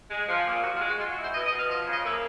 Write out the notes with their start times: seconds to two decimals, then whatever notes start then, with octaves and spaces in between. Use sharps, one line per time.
0.10 G#3
0.28 F3
0.45 A#2
0.62 F3 F#4
0.75 F4
0.80 G#3
0.86 F#4
0.98 G#3 F4
1.09 F#4
1.16 E4
1.22 C5
1.33 B2 D#5
1.45 D#5
1.51 B2
1.57 F5
1.69 F3 D#5
1.87 C#3
1.92 D#5
2.04 A#3 E5